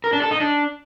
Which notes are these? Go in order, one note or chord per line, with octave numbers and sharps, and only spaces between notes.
A#4
D4
A4
D#4
D4